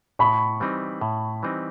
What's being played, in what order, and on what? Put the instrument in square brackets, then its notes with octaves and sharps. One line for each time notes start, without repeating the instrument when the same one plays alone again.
[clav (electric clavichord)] A2 [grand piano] B5 C#6
[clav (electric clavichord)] E3 G3 C4 D#4
A2
E3 G3 C4 D#4